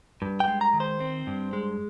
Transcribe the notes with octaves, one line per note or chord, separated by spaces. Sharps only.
G2
G5
G#3
A#5
D#3
C5
C4
G2
G#3